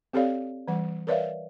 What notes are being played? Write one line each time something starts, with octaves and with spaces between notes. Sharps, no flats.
C4 G4 A4 C#5 D5 F5
E3 G3 F#5
A#4 B4 C#5 D5 E5 F5